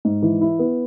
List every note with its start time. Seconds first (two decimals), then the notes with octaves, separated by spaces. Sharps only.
0.05 G#2
0.22 E3
0.41 E4
0.59 B3